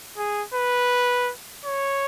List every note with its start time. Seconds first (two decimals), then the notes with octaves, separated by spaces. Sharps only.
0.17 G#4
0.54 B4
1.65 C#5